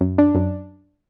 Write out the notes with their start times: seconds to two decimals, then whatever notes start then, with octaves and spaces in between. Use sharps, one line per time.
0.01 F#2
0.18 D4
0.35 F#2